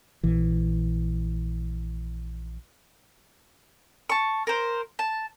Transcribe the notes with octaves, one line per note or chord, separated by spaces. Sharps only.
A#1 E3
A5 C#6
A#4 C5
A5